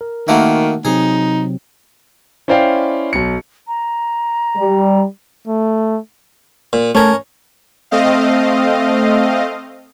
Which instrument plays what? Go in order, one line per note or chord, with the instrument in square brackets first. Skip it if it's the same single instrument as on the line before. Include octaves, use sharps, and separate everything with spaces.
[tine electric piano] A#4
[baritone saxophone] D#3 [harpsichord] A3 A#3 F#4
[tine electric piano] C3 F#3 C4 [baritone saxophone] D#4 [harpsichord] G#4
[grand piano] C#4 E4 C5 D5 F5 G5
B1 C#7
[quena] A#5
[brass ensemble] G3
[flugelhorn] A3
[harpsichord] A#2
[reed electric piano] A3 A5 G#6 [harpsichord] C#4 A#4
[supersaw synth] A3 C4 D#5 F5